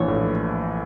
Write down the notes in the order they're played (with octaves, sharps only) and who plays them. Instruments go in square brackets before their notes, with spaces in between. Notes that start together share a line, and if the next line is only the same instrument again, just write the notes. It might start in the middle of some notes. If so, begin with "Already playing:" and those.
Already playing: [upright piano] A#1 E3 [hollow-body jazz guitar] C#5
[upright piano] A2